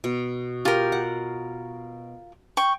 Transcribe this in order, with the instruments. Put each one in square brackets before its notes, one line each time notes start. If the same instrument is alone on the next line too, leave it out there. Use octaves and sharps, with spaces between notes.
[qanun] B2
[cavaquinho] F4 A#4 [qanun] G4
[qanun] F#5
[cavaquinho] G5 C#6